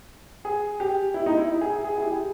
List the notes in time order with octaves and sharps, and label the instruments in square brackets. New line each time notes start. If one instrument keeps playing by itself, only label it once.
[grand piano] G#4
G4
E4
D#4
E4
G#4
G#4
E4
G4